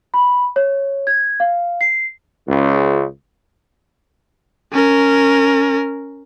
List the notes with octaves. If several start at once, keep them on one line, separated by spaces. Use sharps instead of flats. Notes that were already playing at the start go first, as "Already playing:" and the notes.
B5
C#5
G#6
F5
C7
C#2
C#4 A#4